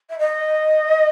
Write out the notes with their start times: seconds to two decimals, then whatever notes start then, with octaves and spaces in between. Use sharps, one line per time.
0.09 E5
0.18 D#5